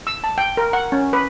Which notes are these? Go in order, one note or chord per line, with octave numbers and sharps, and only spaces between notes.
E6
A5
G5
A#4
F#5
C#4
B4